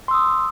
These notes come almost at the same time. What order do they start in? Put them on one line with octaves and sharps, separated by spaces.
C6 E6 D#6